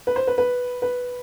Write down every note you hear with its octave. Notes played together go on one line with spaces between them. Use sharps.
B4
C5
B4
B4
B4